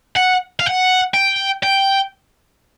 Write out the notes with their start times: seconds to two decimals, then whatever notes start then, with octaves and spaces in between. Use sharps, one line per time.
0.16 F#5
0.60 F5
0.66 F#5
1.14 G5
1.63 G5